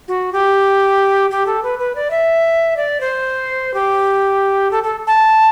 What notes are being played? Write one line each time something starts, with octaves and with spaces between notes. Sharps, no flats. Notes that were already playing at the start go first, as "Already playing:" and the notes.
F#4
G4
G4
A4
B4
B4
D5
E5
D5
C5
G4
A4
A4
A5